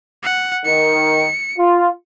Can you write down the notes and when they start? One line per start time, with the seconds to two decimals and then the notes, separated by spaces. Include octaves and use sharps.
0.23 F#5
0.65 D#3 C#7
1.57 F4